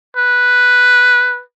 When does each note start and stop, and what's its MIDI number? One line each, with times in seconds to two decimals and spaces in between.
0.17 1.41 71